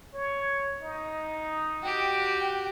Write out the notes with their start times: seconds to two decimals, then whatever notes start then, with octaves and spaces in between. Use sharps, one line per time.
0.13 C#5
0.82 D#4
1.83 F#4 G4 G5